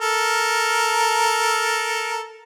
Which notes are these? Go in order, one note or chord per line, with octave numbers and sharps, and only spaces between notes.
A4 A#4